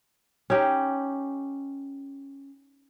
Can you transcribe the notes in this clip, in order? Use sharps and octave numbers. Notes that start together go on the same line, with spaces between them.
C#4 D#4 G4